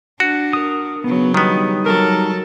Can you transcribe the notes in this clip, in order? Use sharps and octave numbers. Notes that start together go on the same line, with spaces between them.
D4 F#4
A#4 D#6
C#3 F#3 B3
D#3 G3 B3 D#4
F#3 A4 A#4